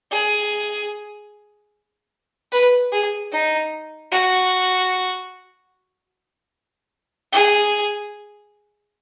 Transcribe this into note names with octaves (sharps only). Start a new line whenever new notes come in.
G#4
B4
G#4
D#4
F#4
G#4